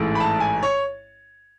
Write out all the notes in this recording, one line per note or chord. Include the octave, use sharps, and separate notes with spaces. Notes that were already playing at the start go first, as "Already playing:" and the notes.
Already playing: A1 G#2 E3 A3
B5
A5
G#5
C#5